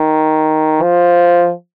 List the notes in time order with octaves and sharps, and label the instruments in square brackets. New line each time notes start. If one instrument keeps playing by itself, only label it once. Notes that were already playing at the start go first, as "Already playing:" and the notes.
Already playing: [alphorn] D#3
F3